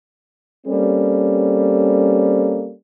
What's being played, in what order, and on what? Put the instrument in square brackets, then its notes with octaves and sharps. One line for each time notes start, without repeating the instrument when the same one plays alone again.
[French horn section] G3 A#3 C4 C#4 A4